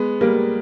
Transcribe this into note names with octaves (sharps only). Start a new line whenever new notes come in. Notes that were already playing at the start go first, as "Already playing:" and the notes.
Already playing: G#3 B3
G3 A#3